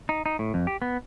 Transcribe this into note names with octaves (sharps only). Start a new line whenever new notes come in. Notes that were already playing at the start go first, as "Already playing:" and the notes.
D#4
D#4
A2
F2
G4
B3